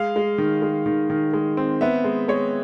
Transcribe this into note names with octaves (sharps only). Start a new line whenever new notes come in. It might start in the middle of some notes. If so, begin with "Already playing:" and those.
Already playing: G#3 F5
G#3
D#3
G#3
D#3
D#3
G#3
C4
B3 E5
G#3
G#3 C#5